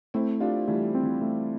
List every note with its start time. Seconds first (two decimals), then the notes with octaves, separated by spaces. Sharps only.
0.14 A3 C4 E4
0.40 D4 F4 G4
0.67 E3 G3 A3
0.95 C4
1.03 E3
1.22 A3